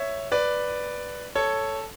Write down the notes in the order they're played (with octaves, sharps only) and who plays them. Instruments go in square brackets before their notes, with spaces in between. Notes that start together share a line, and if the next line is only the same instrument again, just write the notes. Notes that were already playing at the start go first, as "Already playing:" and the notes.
Already playing: [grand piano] C#5 E5
B4 D5
A4 C#5